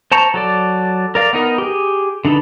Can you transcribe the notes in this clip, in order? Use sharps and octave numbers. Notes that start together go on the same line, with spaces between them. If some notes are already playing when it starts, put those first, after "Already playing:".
C5 A5 A#5 C#6
F#3 A4 D5
A#4 D5 F5
B3 D#4 A#4
G4 G#4
D3 D4 D#4 A4 B4